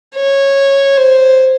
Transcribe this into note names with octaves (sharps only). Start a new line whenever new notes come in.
C#5
C5